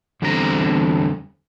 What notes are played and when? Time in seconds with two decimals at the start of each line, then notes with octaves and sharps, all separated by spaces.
0.22 E2 D3 G3 C4 D#4 A#5